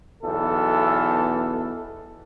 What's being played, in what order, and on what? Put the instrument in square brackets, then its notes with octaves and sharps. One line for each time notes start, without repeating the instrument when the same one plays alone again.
[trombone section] B1 E2 A4